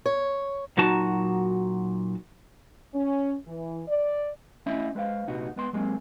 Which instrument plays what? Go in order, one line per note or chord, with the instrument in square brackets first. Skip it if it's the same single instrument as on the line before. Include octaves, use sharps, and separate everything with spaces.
[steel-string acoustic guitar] C#5
[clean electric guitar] A#2 F#3 D#4 F#4 A5
[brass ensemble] C#4
E3
D5
[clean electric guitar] A3 C#4 E4 D#5 E5
G#3 B4 C5 E5 F5
C2 A#2 D#4 F#4 B4
G#3 B3 C6
F#3 G#3 A#3 C4